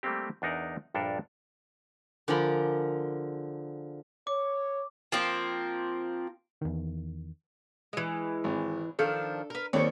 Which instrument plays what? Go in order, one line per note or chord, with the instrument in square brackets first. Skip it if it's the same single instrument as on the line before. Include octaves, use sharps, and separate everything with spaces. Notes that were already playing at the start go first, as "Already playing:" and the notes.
[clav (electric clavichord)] G3 A3 A#3 C4 G4
E2 D4 D#4 A#4 F#5
A#1 G2 D4 A4 A#4
[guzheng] D3 F3 F4 G#4 A#4 B5
[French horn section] C#5 [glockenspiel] D6
[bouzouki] F3 A#3 C4
[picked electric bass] E2 D#3
[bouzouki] E3 G#3
[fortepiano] G#1
[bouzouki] D#3 F3 D4 [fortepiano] A4
[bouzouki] A#4 B4
[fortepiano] D#2 D#3 C4 [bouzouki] C#5 D5